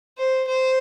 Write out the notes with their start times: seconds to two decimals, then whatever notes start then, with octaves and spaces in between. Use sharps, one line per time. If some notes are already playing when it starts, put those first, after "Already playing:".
0.18 C5
0.48 C5